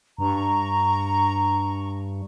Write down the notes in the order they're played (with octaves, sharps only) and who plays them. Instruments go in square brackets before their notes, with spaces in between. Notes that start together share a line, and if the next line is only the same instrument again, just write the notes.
[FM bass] G2 [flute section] A#5 C#6